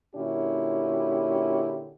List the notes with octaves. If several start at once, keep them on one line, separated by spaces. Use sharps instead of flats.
A#2 D3 C#4 E4 F#4 G4